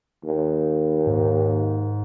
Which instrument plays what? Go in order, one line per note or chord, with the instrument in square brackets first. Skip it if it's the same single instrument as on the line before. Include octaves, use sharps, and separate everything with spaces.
[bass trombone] D#2
[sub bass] G#2